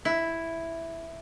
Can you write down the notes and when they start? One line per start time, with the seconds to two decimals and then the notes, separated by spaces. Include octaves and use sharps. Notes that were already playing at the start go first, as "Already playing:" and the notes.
0.05 E4